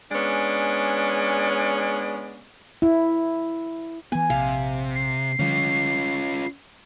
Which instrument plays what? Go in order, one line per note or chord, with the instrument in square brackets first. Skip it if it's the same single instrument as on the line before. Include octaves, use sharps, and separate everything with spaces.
[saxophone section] G#3 B3 C#4 D4 D5
[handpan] E4
[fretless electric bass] E3 B3 [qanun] G#5
[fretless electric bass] A#1 [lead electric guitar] C3 [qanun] F5
[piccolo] C7
[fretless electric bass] D3 F3 G3 [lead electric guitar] C#4 F4